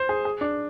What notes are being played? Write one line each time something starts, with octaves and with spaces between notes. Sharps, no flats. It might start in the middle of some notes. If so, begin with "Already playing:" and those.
Already playing: C5
G#4
G#4
D4